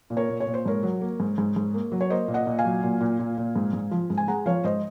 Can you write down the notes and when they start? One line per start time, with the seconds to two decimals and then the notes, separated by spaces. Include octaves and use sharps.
0.10 A#2
0.17 A#4 C#5
0.29 A#2
0.40 C#5
0.47 A#2
0.54 C5
0.66 G#2 A#4 C#5
0.83 F#3
1.01 A#3
1.20 G#2
1.38 G#2
1.56 G#2
1.74 A#3
1.92 F#3
2.01 C#5
2.10 A#3 C5 D#5
2.28 A#2
2.34 D#5 F#5
2.47 A#2
2.58 F5 G#5
2.65 F#3
2.83 A#2
3.01 A#2
3.19 A#2
3.38 A#2
3.56 G#2
3.73 G#2
3.91 F3
4.10 G#2
4.17 G#5
4.28 G#3 F#5 A#5
4.46 F3 C#5 F5
4.64 G#2 C5 D#5